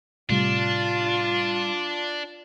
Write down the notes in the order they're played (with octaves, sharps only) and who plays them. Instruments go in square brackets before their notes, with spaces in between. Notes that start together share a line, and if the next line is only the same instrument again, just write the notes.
[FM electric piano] A2 C3 G3 [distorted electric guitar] D4 [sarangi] F4